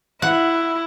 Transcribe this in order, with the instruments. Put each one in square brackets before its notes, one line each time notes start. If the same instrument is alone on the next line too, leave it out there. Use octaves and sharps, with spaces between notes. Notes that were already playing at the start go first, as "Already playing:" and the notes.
[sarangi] E4 [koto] F#5